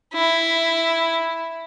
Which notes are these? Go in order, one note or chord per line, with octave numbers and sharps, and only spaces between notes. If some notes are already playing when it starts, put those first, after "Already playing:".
E4